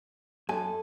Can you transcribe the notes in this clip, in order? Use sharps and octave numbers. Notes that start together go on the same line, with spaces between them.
F#2 A4 G#5